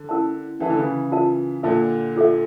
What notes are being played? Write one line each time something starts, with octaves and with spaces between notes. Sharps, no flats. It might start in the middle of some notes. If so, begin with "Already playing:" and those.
Already playing: D3
C#4 E4 A#4 E5 A5
E3 C#4 E4 A#4 E5 A5
D3
C#3 E3
F4 A#4 E5 A5
A#2 D3 F4 A#4 E5 A5
F4 A4 E5